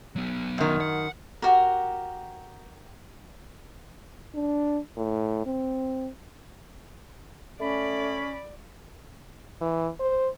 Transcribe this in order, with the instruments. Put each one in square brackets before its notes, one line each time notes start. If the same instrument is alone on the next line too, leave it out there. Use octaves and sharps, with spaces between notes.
[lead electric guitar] F#3 B3
[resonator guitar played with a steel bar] F#2 D#3
[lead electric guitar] F#5
[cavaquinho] F#4 G4 A#4
[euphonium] D4
A2
C4
[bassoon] A3 [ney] C#4 [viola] D5 [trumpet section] B5
[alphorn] E3
C5